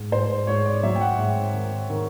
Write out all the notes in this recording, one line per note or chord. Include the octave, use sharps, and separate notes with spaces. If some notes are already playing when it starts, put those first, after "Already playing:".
Already playing: G#2
G#2 C5
G#2 C#5
D5
F#3 E5
G5
F#5
G#2
D#3
D#3